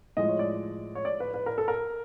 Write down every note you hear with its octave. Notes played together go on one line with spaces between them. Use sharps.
A2 F3 G#3 D#5
C#5
D5
C#5
D5
B4
B4
A#4
A4
A#4